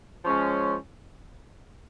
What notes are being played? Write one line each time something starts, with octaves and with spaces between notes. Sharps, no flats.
F3 G#3 C#4